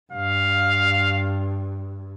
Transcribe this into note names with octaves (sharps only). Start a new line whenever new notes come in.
G2 F5